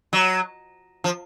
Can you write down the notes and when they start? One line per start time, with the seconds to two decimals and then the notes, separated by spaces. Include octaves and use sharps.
0.13 F#3
1.04 F3